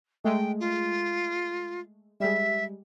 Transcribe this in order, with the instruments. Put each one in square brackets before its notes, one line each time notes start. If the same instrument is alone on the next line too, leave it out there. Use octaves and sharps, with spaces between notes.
[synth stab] G#3 A3 [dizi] G5
[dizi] F4
[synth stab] G3 G#3 [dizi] E5